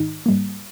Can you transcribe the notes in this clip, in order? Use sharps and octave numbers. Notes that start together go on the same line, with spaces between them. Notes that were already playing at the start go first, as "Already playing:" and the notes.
Already playing: G#2 D#3 D#4
G#2 G3 A#3